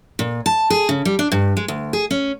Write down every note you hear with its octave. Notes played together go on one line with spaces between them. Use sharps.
A#2
A5
G#4
C#3
G3
D4
G2
G#3
D2
G#4
C#4